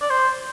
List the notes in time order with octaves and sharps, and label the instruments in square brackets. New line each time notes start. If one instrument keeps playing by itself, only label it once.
[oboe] D5
C5